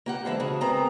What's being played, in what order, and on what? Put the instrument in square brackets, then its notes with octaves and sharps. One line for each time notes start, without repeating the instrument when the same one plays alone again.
[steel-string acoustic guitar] A#3 G4 F#5
[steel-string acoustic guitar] D3 E3 E5 [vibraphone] G#3 C5 A5
[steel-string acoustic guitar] C#3 G#4 [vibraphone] F#4
[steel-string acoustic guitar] B3 C4 A#5 [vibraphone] A#4 G#5 D#6